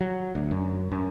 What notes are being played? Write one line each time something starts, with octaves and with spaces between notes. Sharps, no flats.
F#3
D2
F#2
F#2